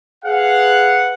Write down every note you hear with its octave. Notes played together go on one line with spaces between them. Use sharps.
G#4 B4 F5 F#5